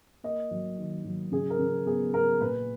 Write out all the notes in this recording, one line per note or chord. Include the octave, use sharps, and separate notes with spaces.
A#3 D#5
F#3
D#3
F#3
C#3 G#4
A#4
C#3
B3 G#4
B3 A#4
A#2 B4